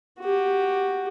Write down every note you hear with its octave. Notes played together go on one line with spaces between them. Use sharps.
F#4 G4